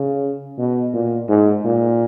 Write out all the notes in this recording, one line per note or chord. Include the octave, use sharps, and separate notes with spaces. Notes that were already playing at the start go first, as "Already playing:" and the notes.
Already playing: C#3
B2
A#2
G#2
A#2